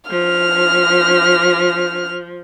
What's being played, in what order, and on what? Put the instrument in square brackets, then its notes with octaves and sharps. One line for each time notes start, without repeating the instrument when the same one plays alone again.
[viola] F3 [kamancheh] F6